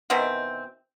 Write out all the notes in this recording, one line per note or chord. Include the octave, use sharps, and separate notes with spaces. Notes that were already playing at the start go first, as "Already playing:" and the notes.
B2 D#3 E3 C4